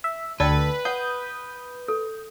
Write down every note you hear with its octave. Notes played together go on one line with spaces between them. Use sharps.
E5
D2 A4 B4 D5 G5
F#5 D#6 G6
A4